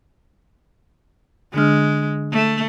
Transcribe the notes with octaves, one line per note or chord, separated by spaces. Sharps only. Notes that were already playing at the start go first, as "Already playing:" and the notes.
D3 G#3 D4 F6
A3